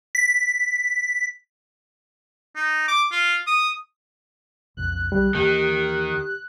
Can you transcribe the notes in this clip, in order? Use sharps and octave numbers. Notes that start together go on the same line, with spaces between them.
B6
D#4
D6
F4
D#6
B1 F2 C#3 F#6
B1 D#3 G3
D#2 D#3 E3 A#3 G4